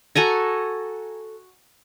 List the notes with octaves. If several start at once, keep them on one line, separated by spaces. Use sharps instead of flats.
F#4 A4 G#5 A#5